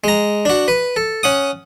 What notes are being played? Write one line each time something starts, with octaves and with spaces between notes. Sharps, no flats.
G#3 A#5
D4 F#4
B4
A4
C#4 F#5 D#6